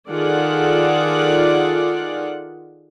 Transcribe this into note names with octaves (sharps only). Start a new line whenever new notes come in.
D#3 F4 G#4 A4 D5 F#5